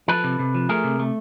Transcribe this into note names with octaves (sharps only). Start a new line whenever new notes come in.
F3 A4 B4
C3
C3
F3
A3 G#4 A#4
C3
A3